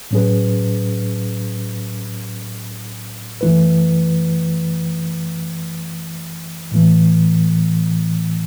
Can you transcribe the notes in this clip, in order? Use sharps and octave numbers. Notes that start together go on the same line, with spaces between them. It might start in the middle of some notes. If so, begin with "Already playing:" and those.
A2 F#3 C#4 G#4 B4
F#2 E3 A3 E4 B4
A2 E3 A3